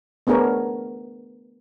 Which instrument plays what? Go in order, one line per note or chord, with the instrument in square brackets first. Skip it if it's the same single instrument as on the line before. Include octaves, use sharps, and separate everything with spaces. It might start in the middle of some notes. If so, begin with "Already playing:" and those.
[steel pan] A3 B3 D4 G#4 A#4 C#5